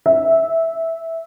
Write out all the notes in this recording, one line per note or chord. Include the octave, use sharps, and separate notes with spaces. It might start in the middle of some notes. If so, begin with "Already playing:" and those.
E5